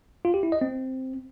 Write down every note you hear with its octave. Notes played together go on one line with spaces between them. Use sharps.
F4
G4
E4
D#5
C4